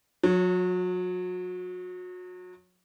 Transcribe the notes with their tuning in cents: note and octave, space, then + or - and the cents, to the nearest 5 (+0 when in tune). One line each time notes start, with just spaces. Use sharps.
F#3 -35 C#5 +0